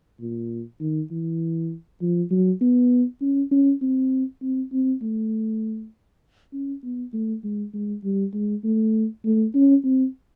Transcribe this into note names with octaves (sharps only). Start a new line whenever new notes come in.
A#2
D#3
E3
F3
F#3
B3
C#4
C#4
C4
C4
C4
A3
C#4
B3
A3
G#3
G#3
G3
G#3
A3
A3
C#4
C4